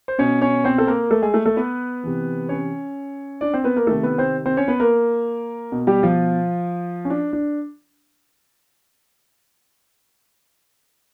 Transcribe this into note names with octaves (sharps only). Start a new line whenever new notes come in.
C5
B2 C#4 C#5
C#4 C#5
C4 C5
A4
A#3 A#4
A3 A4
G#3 G#4
A3 A4
A3 A4
B3 B4
C3 E3
C#4 C#5
D4 D5
C4 C5
B3 B4
A#3 A#4
C3 D#3 A3 A4
B3 B4
C4 C5
C4 C5
C#4 C#5
B3 B4
A#3 A#4
B2
G3 G4
F3 F4
C#4
D4
D4